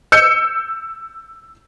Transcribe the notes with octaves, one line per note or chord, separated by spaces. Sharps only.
E6 G6 C#7